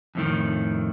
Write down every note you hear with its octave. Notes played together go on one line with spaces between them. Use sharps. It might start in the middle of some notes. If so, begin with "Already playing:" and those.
F2 A2 D#3